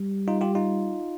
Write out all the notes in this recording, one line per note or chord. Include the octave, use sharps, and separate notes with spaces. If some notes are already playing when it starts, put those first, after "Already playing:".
Already playing: G3
D#4 F4
F4 G4
D#4 F4